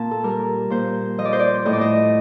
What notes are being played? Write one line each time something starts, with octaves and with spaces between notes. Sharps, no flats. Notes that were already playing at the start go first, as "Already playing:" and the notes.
Already playing: A#2 A5
A4
G3 A#4
A#2 C5
F3 D#5
D5
C5
D5
A2 D#5
D5
D#5